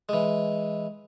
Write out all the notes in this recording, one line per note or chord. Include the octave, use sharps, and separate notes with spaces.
E3 G#3